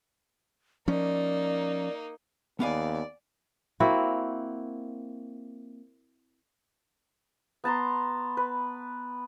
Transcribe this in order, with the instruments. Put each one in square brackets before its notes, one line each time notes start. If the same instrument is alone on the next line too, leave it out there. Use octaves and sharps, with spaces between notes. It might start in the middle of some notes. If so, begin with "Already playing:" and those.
[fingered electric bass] F3 C#4 [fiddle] A#3 D#4 [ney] D5
[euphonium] D#2 [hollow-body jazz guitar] B3 F5 G#5 [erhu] D5
[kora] A#3 C4 E4 F#4
[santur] B3 A5 A#5 C6
B4